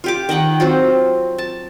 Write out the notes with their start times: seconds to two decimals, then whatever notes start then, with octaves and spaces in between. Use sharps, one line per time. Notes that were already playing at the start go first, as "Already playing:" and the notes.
0.04 F4 G4 D6
0.29 D#3 D#5 F#5 G5
0.60 F#3 C4 F4
1.38 A5